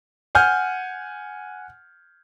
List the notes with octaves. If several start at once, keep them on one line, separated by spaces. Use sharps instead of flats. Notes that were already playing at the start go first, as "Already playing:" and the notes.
F#5 G#5 F6 G6